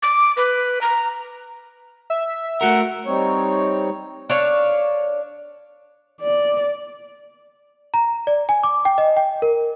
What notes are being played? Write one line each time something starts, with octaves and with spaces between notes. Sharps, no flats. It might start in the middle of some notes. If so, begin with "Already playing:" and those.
D6
B4
A#5
E5
A3 F#4 A#4 F#5
G3 C4 D#4 C#5
D4 C#5 F5
D5
A#5
D5
G#5
D6
G5
D#5
G5
A#4